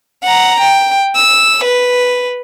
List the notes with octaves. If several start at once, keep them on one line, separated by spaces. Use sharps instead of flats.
F#5 A#5
G5
E6
B4